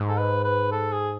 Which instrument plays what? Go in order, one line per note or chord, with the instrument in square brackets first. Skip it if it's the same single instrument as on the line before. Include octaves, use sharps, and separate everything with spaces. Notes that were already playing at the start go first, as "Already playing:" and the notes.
Already playing: [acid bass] G#2
[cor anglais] A4
B4
B4
A4
G#4